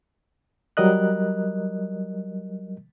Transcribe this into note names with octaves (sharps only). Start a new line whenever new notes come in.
F#3 G3 A#4 D#5 F#6